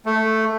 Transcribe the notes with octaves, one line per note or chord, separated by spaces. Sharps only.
A3